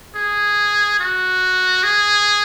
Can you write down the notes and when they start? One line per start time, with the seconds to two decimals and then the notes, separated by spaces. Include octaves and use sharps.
0.15 G#4
0.99 F#4
1.83 G#4